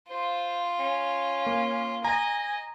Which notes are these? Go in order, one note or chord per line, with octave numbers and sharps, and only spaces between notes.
F4 C5
C#4
A#3
D#5 G#5 A#5